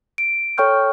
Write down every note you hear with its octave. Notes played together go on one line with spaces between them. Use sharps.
D7
A4 C#5 G5 C#6 F6 G6